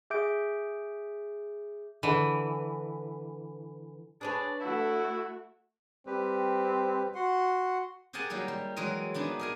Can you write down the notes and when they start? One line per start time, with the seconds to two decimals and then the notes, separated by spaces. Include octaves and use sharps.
0.10 G#4 E5 D6 G6 D7
2.03 D3 E3
4.21 D4 G#4 B4 C#5 D5
4.60 A3 E4 F#4 E5
6.07 G3 C4 G4 B4
7.15 F#4 F#5 C6
8.13 G4 G#4 A#4 F#5 G#5 A5
8.30 F#3 G3 A#3 D#4
8.48 G3
8.76 E3 F#3 G#3 A#4 D#5
9.14 B3 D4 D#4 G#4
9.39 G#4 A#4 G#5